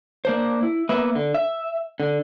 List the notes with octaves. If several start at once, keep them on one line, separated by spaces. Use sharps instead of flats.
A#3 D4 C5
E4
A#3 B3 B4 E5
D3
E5
D3